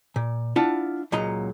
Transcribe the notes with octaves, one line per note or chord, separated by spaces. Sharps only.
A#2
D4 E4 F4 F#5 A5
C#2 A#2 F#3 D#5 A#5